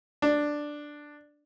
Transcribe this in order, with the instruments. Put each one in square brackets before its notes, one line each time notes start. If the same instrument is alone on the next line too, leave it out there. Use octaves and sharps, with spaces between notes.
[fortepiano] D4